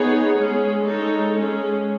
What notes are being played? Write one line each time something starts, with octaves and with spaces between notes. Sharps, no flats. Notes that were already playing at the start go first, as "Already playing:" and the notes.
Already playing: B3 D#4 G#4 C#5
G#3 C#4 G#4
G#3 D#4 A4 C#5
G#3 C#4 G#4